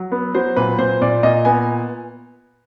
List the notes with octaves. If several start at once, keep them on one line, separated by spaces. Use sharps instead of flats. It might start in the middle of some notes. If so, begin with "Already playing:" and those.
Already playing: F#3
B3
F#3 C5
A#2 B4
A#2 C5
A#2 D5
A#2 D#5
B3 G#5